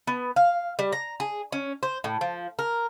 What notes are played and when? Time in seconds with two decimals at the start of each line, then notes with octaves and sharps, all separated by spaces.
0.07 B3
0.36 F5
0.79 G3
0.92 A#5
1.20 G#4
1.52 C#4
1.83 C5
2.04 A2
2.21 F3
2.59 A#4